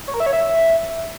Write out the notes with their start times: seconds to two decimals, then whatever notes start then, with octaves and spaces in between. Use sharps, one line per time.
0.08 C#5
0.14 A#4
0.20 E5
0.26 C#5
0.33 E5